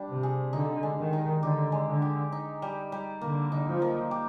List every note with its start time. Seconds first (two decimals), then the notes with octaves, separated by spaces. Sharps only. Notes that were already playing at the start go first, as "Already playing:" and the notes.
Already playing: G3 D4
0.09 C3
0.23 G#4
0.53 D3 D#4
0.83 G#3
0.97 D#3
1.13 D#4
1.42 D3 G4
1.72 G#3
1.87 D3
2.02 G4
2.32 D#4
2.62 G3
2.92 G3
3.21 D3 A#3
3.52 D#4
3.66 F3
3.82 A#3
4.11 G4